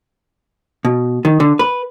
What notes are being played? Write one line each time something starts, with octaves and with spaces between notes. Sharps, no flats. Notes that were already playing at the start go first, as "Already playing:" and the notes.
B2
D#3
D3
B4